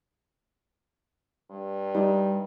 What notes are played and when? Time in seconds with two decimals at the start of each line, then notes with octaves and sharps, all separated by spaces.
1.51 G2
1.95 G3 D#4